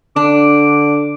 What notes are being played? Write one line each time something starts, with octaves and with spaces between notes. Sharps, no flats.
D3 D4 D6